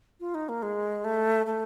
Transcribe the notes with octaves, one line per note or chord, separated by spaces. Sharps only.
F4
D#4
A#3
G#3
A3
A3